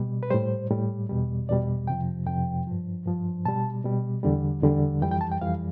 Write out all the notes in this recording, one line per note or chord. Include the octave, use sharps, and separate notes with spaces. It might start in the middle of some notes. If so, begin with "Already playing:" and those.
Already playing: B2 G3
B4
A2 G3 C5
A2 G3
E2 B2 G3
E2 B2 G3 D5
F2 C3 F3 G5
F2 C3 F3 G5
G2 F3
G2 F3
B2 G3 A5
B2 G3
E2 D3 G3
E2 D3 G3
F2 E3 G3 G5
G5
A5
G5
F2 E3 G3 F5